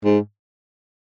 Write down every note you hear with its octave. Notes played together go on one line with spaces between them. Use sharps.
G#2